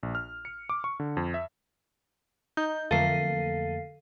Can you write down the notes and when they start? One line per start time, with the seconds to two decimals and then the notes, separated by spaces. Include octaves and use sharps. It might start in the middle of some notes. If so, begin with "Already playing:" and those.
0.03 A#1
0.15 F6
0.45 C#7
0.69 D6
0.84 C#6
1.00 D3
1.17 F2
1.34 E5
2.57 D#4 G6
2.91 F2 D3 A3 A#3 A4 F5 C7 D#7